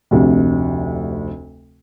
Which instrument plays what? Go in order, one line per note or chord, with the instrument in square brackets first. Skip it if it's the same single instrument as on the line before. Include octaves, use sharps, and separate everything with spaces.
[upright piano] F1 D2 C3